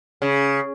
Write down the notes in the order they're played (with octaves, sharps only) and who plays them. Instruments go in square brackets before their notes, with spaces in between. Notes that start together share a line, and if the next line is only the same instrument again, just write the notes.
[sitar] C#3